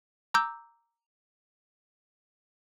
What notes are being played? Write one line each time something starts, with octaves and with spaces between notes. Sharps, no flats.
A#5 D6 E6 G6